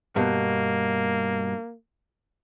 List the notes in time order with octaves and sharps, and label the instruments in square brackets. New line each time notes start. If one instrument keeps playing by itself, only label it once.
[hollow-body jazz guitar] G2 B2 [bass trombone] A#3